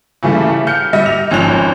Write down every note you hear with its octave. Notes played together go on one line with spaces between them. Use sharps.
C#3 E3 G3 A3
F6 G6 C#7
G3 D#5 E5
F7
G#1 F2 C#4 F#6 F7